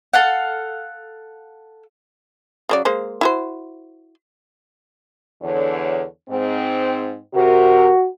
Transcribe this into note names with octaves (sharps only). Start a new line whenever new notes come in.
A4 F5 F#5
C#3 F#3 D5
G#3 A#3 C5
E4 F#4 C5
E2 D3 C#5
G#2 C4
C3 F#4 A#4